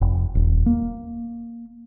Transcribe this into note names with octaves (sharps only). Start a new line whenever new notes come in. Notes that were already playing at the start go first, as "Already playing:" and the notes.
F1
D#1
A#3